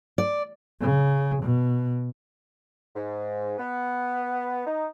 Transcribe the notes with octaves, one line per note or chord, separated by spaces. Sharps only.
D5
C#3
B2
G#2
B3
D#4